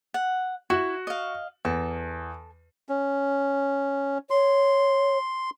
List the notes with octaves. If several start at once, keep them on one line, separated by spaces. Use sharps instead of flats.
F#5
E4 F#4
D#5 F5
E2 A4
C#4
C#5 C6